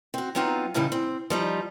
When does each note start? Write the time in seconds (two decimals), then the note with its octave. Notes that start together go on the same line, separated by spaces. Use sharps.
0.14 C4 F#4
0.35 F#3 B3 C4 D#4 F4
0.74 A2 C#3 E3 G3 D#4
0.92 C4
1.30 F3 G3 D#4